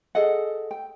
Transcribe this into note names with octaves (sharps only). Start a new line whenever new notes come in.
G#4 A4 D#5 F#5
G5